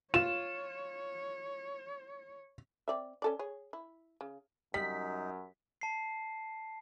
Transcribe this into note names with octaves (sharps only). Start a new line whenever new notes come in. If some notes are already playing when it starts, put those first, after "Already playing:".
F4 C#5 E7
C4 D5 E5
C#4 A4 D5
G#4 C#5
E4
C#3
F#2 G3 D#4 B6
A5 C7